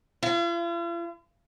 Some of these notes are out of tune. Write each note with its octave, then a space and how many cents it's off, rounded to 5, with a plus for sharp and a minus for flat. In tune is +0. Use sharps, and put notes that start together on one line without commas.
F4 -45